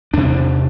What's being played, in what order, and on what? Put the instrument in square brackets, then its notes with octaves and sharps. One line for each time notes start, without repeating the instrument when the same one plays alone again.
[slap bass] E2 C3 D4